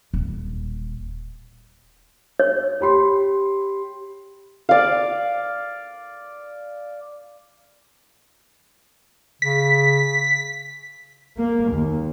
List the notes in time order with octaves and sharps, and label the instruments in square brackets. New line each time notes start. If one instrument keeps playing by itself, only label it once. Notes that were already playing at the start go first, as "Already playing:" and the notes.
[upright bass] D#1
[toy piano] C#5
[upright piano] G4 B5 C6
[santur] D5 F5
[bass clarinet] C#3 [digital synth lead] B6
[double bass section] A#3
D#2